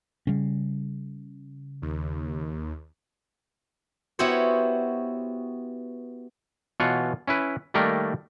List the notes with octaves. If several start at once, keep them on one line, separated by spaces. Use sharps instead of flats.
C#3 G3 C#4
D#2
B3 E4 F#4 G4 C5 C#5
B2 E3 F4 C#5 F#5
C#4 E4 B4
D#3 G3 A3 A#3 A#4 D5